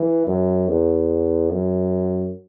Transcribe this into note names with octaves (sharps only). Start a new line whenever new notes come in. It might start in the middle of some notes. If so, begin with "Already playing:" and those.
Already playing: E3
F#2
E2
F#2